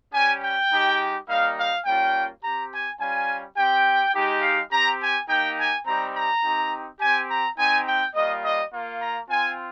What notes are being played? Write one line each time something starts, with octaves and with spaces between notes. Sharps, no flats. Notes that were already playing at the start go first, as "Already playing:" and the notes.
G3 C#4 G4 G#5
G5
G#3 D#4 G4
G3 A#3 D#4 F5
F5
G3 A#3 C#4 F4 G5
C4 G4 A#5
G#5
G3 C#4 F4 G#5
C4 G4 G5
G#3 D#4 G4
F5
C4 G4 A#5
G#5
A#3 D#4 G4 G5
G#5
G3 C4 D#4 G4 A#5
A#5
C4 D#4 G4
C4 G4 G#5
A#5
C4 D#4 G4 G#5
G5
G3 A#3 F4 D#5
D#5
A#3 F4
A#5
C4 F4 G#5